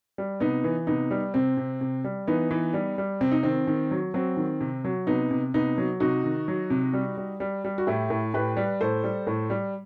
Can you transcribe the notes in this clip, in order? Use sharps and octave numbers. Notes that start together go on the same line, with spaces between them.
G3
C3 B3 D#4
E3
C3 B3 D#4
G3
C3 C4
C3
C3
G3
E3 B3 D#4
E3
G3
G3
C3 C4
D#4
D#3 C4
D#3
F#3
F#3 C4
D#3
C3
F#3
C3 B3 D#4
C3
C3 B3 D#4
F#3
C3 D#4 F#4
D#3
F#3
C3
G3
G3
G3
G3
F#4
A2 E4 G4
A2
A2 G4 B4
G3
A2 A4 C5
G3
A2
G3